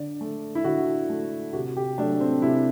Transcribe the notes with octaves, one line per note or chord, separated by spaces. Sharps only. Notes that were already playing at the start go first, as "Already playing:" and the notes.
Already playing: D3 D5
A3
E4
D3 F#4
A3
C3 F#4
G4
F#3 A3 D4
C4
C3 E4